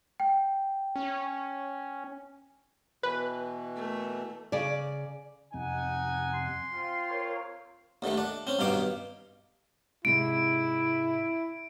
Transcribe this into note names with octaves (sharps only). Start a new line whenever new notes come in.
G5
C#4
B2 E3 B4
A3 A#3
C#3 D5
F2 C3 D#4 F#5 G#5
C6
C4 F4
A#4 C#5
D#2 D3 D#3 A3
D4
C4 C#4
G2 B2 D#3 F5 D6
G#2 C3 G#3 E4 D7